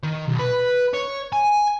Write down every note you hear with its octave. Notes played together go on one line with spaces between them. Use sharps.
D#3
B1
B4
C#5
G#5